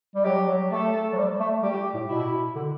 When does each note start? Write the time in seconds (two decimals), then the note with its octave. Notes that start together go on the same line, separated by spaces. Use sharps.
0.15 G3
0.25 F#3 G4
0.48 F#3
0.71 A3 A4
1.13 F#3
1.17 G3
1.40 A3
1.63 G3 G4
1.94 A2
2.09 B2 E4
2.56 D3